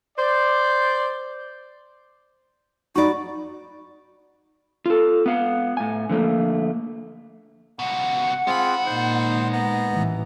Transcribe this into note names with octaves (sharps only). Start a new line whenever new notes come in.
C5 D5
D#4 F#4 D5 B5 C#6
F4 A4
B3 F5 F#5
A2 G#5
D3 F3 A3 A#3
C#2 B2 F#5
G#3 C4 F4 G#4 B5
A#2 D#4 C5
B3 A#5
A1 E3